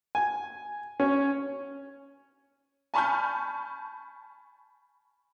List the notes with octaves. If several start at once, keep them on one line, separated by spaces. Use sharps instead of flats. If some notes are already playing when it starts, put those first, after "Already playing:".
G#5
C#4
G#5 A5 B5 C#6 F6 G6